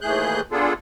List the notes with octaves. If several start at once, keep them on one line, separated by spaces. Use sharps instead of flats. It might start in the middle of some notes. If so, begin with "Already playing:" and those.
D#2 E3 A3 G#4 F#6 G6
B3 D4 F4 G#4 A4